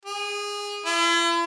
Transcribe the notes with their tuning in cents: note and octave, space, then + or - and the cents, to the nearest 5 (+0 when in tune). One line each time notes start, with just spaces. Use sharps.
G#4 -20
E4 +45